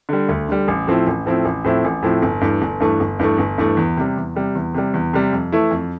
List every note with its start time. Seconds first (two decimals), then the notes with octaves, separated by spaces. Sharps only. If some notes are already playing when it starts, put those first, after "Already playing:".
0.09 D3 G3
0.29 D2
0.49 D3 G3
0.68 A1
0.87 A2 F3 C4 E4
1.07 A1
1.26 A2 F3 C4 E4
1.45 A1
1.64 A2 F3 C4 E4
1.84 A1
2.03 A2 F3 C4 E4
2.22 G1
2.41 G2 E3 A3
2.62 G1
2.80 G2 E3 A3
3.00 G1
3.19 G2 E3 A3
3.38 G1
3.58 G2 E3 A3
3.77 E2
3.97 C3 G3
4.17 E2
4.36 C3 G3
4.55 E2
4.74 C3 G3
4.94 E2
5.13 C3 G3
5.33 F2
5.52 E3 A3 E4
5.71 F2